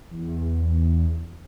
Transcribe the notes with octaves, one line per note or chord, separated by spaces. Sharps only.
E2